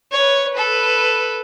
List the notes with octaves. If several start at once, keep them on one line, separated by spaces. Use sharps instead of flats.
B4 C#5
A4 B4